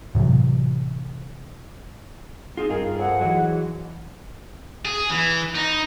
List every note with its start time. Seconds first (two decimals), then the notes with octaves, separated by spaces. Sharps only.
0.15 A2 C3 E3 F#3
2.57 C4 D#4 F4 G#4
2.70 G2 D#3 F4 G#4 A#4
2.99 F2 F#5
3.21 E3 F#3 G#3
4.85 G#4
5.10 E3
5.55 D#4